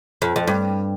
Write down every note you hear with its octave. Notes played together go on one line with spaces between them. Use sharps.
F2
F2
G2